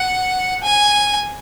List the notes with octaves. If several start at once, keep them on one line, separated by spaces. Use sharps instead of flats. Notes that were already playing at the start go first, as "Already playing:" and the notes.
Already playing: F#5
G#5